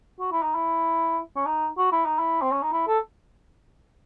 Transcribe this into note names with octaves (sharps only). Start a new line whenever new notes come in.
F#4
E4
D#4
E4
C#4
D#4
F#4
E4
D#4
E4
C4
C#4
D#4
E4
A4